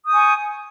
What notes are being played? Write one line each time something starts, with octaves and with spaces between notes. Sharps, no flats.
G#5 C#6 D#6 G6